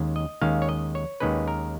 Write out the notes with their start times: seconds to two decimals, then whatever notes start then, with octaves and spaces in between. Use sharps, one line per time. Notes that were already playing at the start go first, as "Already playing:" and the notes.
Already playing: D#2 D#3 G#3 C#4
0.16 D#5
0.41 D#2 D#3 G#3 C#4 F5
0.62 C#5
0.69 D#5
0.95 C#5
1.20 D#2 D#3 G#3 C#4 B4
1.48 A#4